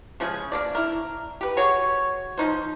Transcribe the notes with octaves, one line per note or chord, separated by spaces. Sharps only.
C#3 F3 G#3 G#4
A#3 D4 D5
E4 A#4
G4 B4
F#4 G#4 C#5
F3 D#4 C5